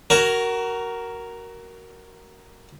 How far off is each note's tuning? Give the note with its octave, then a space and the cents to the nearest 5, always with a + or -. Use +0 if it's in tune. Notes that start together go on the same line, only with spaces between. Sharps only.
F#4 +25 A#4 +0 C#5 +0